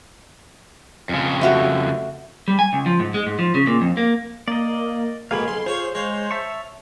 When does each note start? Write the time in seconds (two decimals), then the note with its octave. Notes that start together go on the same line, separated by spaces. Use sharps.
1.09 F2 C#3
1.41 A3 F#4 G4
2.48 G3
2.59 G#5
2.73 C#2
2.86 F3
3.00 G#2
3.14 G#3
3.26 G#2
3.39 F3
3.55 C#3
3.67 A#2
3.81 F2
3.97 A#3
4.48 A#3 D5 D#5
5.31 F2 G#2 B2 A#3 F5 G#5 B5
5.48 B1 C6
5.66 F4 G#4 C5 C#5 G#5
5.95 G#3 C#5 F5
6.31 E5 A5 C#6